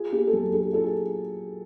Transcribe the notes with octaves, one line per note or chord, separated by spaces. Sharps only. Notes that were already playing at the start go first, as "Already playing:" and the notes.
Already playing: F4 G#4
A#3 G4
A4
F#3 G#4
D4 G4 A4
F4 A4
G#4